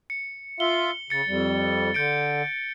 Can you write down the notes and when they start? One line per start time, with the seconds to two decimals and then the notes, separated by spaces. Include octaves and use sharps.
0.10 C#7
0.60 F4 E5 F5 G7
1.10 C#3 A6 C#7
1.28 F2 G3
1.94 D3 G6 C#7 D7